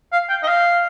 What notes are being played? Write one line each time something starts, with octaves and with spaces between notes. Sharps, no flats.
F5
G5
D#5
F5